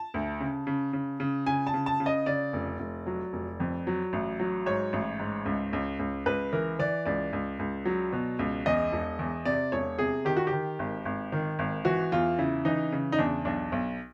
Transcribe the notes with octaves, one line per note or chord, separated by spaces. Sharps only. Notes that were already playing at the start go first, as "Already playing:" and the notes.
Already playing: A5
D2
C#3
C#3
C#3
C#3
C#3 G#5
A5
C#3
A5
C#3
D#5
C#3 D5
F1
F1
F#3
F1
F2
F#3
A1
F#3
G#2 C#5
A1
G#2
C#2
C#2
C#2
C#2 B4
E3 A#4
E3 D5
C#2 D5
C#2
C#2
F#3
B2
C#2
E2 D#5
E1
E2
C3 D5
E1 C#5
C3 G#4
D#3 G4
F#4
D#3 G4
G#1
G#1
D#3
G#1
E3 F#4
E2 F4
C#3 E4
E3 D#4
C#3
D#4
E2 D4
B1 D4
B1